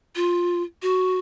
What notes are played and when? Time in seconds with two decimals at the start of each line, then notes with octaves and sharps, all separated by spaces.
0.16 F4
0.82 F#4